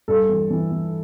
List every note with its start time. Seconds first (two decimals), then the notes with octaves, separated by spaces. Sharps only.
0.08 G2 A4
0.29 E3
0.50 E3
0.72 E3